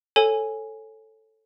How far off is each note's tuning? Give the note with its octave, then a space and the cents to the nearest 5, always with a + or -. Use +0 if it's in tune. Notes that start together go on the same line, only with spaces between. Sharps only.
A4 +0 C#5 -20 G#5 +0